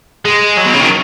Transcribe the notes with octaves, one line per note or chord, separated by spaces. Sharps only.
G#3
F#3
B2
C#3
D#3